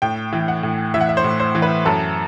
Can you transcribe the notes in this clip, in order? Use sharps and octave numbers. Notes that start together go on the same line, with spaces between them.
A2 G5
E3
F#5
A2
E3 E5
F#5
E5
C5
A2
C5
E3
B4
F#2 A4